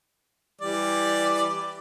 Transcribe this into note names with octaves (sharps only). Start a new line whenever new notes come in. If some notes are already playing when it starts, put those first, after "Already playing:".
E3 G3 D5